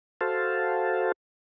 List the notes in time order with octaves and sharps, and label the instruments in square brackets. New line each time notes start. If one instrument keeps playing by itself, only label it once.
[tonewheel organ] F#4 A4 C5 F5 A5